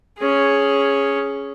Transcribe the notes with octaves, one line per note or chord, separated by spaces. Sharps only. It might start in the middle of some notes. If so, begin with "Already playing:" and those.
C#4 G#4